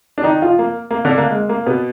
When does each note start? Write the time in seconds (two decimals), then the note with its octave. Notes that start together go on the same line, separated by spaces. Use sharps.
0.18 D4
0.23 D#3 D#4
0.42 F3 F4
0.59 A#3
0.91 A#3
1.05 D3 D4
1.18 A#3
1.30 G#3
1.49 A#3
1.66 B2 B3